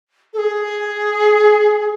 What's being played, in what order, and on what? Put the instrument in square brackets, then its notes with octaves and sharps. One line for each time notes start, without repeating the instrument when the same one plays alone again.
[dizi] A4
G#4